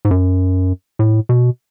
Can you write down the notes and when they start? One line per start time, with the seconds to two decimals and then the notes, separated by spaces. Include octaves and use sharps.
0.05 G#2
0.11 F#2
0.99 A2
1.29 B2